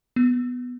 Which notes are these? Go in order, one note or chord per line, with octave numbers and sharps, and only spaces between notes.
B3